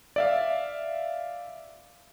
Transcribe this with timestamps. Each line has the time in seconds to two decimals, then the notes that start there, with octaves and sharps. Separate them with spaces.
0.16 D5 E5 F5